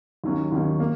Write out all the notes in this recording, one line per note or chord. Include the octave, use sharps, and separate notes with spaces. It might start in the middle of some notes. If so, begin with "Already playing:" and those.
D#2 D#3 F#3 C#4
D#2 D#3 F#3 C#4
A#3